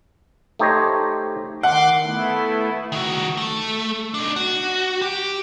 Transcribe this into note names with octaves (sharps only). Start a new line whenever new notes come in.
A3 D#4 G4 C5 C#5 D#5
D#3 F#5 C6 D6
A3 B3 E4
D#3 F#4
A3
D4 D#4
F#4
G4